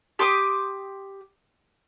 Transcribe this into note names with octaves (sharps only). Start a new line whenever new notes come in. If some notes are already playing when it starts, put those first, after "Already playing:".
G4 C6 D6 D#6